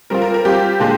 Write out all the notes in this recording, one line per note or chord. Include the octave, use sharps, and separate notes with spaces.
G3 C4 F4 A#4
A#4
A#4
G3 C4 F4 G4
A#2 G#3 D4